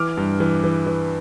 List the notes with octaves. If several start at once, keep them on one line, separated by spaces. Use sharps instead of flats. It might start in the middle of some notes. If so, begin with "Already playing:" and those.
Already playing: E3 D6 F6
G2
E3
E3
E3